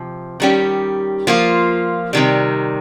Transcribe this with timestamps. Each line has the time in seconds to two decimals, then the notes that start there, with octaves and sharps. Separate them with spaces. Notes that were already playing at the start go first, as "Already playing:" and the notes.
Already playing: C3 F3
0.40 D#3 G3 C#4 G4
1.27 F3 A#3 F4
2.13 C3 D#3 G3